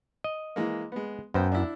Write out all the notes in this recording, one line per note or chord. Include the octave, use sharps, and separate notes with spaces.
D#5
E3 G#3 A#3
G#3 B3
F#2 B3 C5 G5
D4 E4